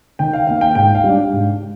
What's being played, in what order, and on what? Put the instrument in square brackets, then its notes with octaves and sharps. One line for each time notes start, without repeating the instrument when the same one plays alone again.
[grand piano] D#3 G5
F5
A#3 D#4 F5
G5
G#2 G5
F5
G3
D4
G#2